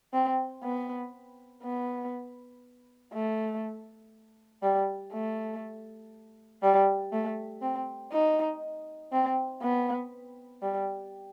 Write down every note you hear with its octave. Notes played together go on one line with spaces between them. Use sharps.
C4
B3
B3
A3
G3
A3
G3
A3
C4
D#4
C4
B3
G3